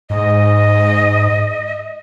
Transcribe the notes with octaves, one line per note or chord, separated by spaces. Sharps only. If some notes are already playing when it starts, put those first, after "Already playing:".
G#2 D#5